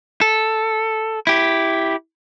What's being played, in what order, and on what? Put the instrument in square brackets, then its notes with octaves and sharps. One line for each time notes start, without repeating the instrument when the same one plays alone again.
[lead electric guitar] A4
E4 G4